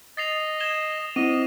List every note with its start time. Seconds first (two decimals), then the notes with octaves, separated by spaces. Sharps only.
0.17 D#5 A6 C7 F7
0.60 G#6 E7 G7
1.16 C4 E4 D#5 D#7